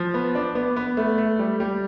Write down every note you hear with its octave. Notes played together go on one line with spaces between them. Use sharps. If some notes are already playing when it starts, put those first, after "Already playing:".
Already playing: F3
B3
D4
B3
B3
A3
A3
G3
G3